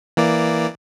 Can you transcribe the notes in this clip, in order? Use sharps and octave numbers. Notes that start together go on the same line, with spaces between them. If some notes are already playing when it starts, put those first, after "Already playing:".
E3 A#3 D5